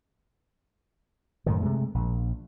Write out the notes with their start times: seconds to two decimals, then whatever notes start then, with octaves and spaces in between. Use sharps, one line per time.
1.46 F#2 A2 D#3
1.61 C3 G#3 A3
1.94 A#1